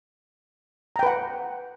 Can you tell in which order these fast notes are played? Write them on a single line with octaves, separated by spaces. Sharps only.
A#5 G5 B4 F#5